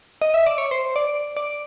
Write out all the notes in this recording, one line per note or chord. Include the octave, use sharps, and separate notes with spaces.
D#5
E5
D5
C#5
C5
D5
D5